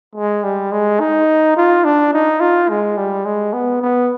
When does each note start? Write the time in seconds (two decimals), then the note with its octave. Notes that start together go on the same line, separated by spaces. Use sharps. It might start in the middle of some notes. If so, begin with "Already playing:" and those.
0.15 G#3
0.44 G3
0.72 G#3
1.00 D#4
1.57 F4
1.84 D4
2.13 D#4
2.41 F4
2.69 G#3
2.97 G3
3.25 G#3
3.53 B3
3.81 B3